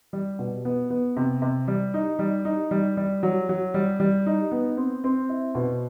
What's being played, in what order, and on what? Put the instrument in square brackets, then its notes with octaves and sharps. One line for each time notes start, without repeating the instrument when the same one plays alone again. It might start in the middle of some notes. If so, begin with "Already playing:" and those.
[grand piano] G3
B2
B3
B3
C3
C3
G3
D#4
G3
D#4
G3
G3
F#3
F#3
G3
G3
D#4
B3
C4
C4
E4
B2